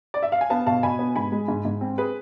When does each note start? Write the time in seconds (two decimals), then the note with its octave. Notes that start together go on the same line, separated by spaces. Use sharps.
0.14 D5
0.23 E5
0.32 F5
0.41 G#5
0.50 B3 F5 A5
0.66 B2 F5 A5
0.83 B2 G#5 B5
0.99 B3
1.16 G#2 G#5 B5
1.32 G#3
1.48 G#2
1.65 G#2
1.81 C4
1.98 G#4 B4